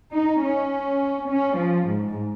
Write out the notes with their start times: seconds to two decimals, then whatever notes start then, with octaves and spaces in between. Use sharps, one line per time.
0.12 D#4
0.41 C#4
1.29 C#4
1.58 F3
1.88 G#2